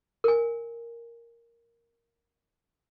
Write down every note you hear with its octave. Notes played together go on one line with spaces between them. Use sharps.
A#4 G#5